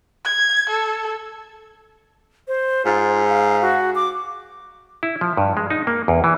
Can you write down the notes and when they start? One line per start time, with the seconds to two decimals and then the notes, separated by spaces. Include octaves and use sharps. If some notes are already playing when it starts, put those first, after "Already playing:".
0.25 G#6
0.69 A4
2.48 C5
2.85 G#2 F4
3.28 F5
3.62 F#4
3.95 D6
5.03 E4
5.21 F3
5.37 G2
5.57 G#3
5.70 D#4
5.87 A#3
6.08 E2
6.24 E3